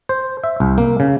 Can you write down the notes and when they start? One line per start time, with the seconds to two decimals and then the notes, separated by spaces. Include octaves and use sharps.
0.09 C5
0.44 E5
0.60 C2
0.78 A#3
1.00 C#3